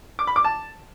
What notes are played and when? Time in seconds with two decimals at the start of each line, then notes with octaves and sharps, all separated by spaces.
0.19 D6
0.27 B5
0.36 D6
0.44 A5